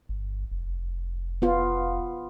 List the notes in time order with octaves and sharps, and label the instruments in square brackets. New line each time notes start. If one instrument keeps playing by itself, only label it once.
[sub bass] G1
F1
[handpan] B3 F4